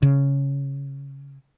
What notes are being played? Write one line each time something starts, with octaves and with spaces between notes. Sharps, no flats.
C#3